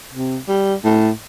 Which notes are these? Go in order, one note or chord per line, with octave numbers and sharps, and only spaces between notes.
C3
G3
A2